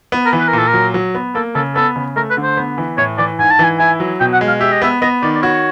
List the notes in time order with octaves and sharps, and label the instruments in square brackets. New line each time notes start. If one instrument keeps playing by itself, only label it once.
[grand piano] B3
[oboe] A#4
[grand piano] E3
[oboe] B4
A#4
[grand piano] A#2 [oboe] A4
[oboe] A#4
[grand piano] F#3
F#3
B3
[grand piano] A#3 [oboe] A4
[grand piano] C#3 [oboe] A4
[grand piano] B3 [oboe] A4
[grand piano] C#3
[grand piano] A3 [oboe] A#4
[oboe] B4
[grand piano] D3
[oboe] C5
[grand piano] B3
E3
[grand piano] A2 [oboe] C#5
[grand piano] E3 [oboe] D5
[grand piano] G#2 [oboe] G#5
[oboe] A5
[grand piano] E3 [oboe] G#5
[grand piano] E4 [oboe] G#5
[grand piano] F#3
[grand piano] B2 [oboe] G5
[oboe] F#5
[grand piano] G#3
[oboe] F5
[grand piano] G4 [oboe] E5
[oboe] D#5
[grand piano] B3 [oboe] E5
[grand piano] B3 [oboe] D#5
[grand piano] D#3 [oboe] D5
[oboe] D5
[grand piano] F#4 [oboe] C#5